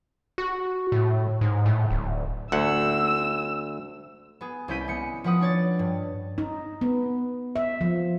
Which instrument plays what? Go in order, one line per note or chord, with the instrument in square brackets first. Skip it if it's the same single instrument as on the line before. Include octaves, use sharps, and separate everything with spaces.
[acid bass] F#4
A2
G#2
A2
D1
[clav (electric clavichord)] D2 F#5 [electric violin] E6
[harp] B3 G#4
C2 C#4 E4 G6 B6 D#7
G#3 B3 C#7
F3 B4 F#5 D#6
D4 C#5 A6
G2
[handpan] D#4
B3
E5
F3